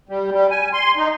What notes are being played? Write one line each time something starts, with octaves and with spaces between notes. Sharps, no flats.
G3
G3
G#5
C6
D#4